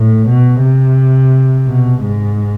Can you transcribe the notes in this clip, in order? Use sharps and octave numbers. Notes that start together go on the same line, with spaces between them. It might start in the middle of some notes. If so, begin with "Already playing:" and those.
Already playing: A2
B2
C3
B2
G#2